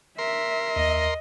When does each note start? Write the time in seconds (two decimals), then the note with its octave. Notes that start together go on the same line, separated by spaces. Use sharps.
0.18 A#4 E5 C6
0.76 D#2 D#5